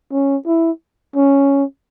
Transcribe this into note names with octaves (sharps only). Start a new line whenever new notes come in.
C#4
E4
C#4